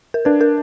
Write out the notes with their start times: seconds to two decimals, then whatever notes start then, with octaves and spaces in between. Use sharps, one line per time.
0.14 A#4
0.25 D4 B4
0.41 A#4